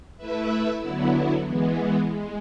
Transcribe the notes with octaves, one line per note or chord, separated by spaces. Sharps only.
A3 E4 B4 E5
D3 F#3 B3 E4
E3 G#3 B3
G#3